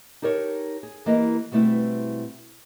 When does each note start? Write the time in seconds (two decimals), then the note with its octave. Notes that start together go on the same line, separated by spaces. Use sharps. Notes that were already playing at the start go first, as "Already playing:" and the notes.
0.22 D#4 G4 A4 A#4 C#5
0.83 G#4
1.06 E3 A#3 G4 A#4 D#5
1.52 B2 G3 A3 C4 E4 B4